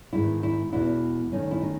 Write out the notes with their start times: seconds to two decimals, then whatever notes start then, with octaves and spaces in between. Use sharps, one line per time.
0.13 G#2 D#3 G#3 B3 E4
0.43 E4
0.72 E2 B2 G#3 B3 E4
1.32 E2 D#3 A3 C#4 D#4
1.51 E4
1.62 D#4